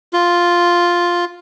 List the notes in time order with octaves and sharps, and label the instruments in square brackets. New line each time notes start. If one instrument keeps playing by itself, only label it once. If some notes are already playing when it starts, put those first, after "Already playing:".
[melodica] F4